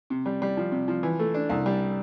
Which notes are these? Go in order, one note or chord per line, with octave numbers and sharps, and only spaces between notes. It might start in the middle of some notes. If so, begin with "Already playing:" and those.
C3
G3
G3
F3
C3
F3
E3
A3
D4
C2
G3